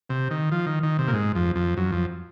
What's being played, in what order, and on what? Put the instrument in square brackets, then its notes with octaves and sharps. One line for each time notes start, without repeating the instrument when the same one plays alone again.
[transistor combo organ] C3
D#3
F3
D#3
D#3
C3
A#2
G#2
F2
F2
F#2
F2